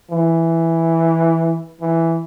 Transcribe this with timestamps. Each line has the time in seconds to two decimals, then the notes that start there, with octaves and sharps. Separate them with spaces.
0.11 E3
1.80 E3